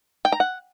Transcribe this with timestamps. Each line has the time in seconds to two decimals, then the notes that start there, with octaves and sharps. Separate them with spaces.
0.25 G5
0.32 A#5
0.40 F#5